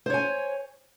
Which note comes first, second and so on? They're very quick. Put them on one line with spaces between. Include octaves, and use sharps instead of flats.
C5 C#5 G#5